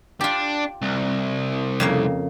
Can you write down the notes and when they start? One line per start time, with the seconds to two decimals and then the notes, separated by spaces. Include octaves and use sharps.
0.21 D4 F4 G4
0.82 C2
1.80 F2 C#3 A#3